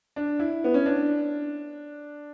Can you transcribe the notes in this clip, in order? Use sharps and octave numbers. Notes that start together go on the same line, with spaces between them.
D4
E4
B3
C#4
D4